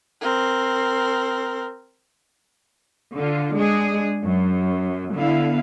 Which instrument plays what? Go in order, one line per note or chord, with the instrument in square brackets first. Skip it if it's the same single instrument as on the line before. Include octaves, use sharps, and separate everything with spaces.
[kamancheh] C4 A#4
[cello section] D3 F4
G#3 D4 G#4
F#2
D3 B3 E4 F5